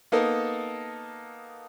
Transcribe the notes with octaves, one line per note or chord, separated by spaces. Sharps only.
A#3 B3 D#4 A4 A#4